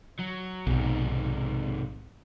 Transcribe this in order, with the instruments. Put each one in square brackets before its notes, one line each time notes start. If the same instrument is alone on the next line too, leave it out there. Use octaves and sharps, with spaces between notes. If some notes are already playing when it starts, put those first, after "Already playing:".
[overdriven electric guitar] F#3
[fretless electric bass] B1 [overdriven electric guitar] G#2 C3